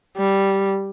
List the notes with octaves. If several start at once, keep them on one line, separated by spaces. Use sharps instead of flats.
G3